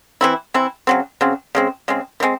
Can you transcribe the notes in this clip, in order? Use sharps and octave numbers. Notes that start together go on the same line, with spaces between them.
E3 C4 E4
E3 C4 E4
C#3 F#3 C4
C#3 F#3 C4
C#3 G#3 C4
C#3 G#3 C4
E3 G#3 C4